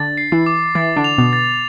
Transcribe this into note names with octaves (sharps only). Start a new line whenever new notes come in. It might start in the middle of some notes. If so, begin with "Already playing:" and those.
Already playing: D3 D4 A6
C7
E3 E4
D6
E3 E4 A6
D3 D4
F7
B2 B3
A6